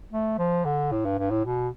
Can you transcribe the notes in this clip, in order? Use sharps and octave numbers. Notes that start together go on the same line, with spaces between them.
A3
F3
D3
A2
G2
G2
A2
B2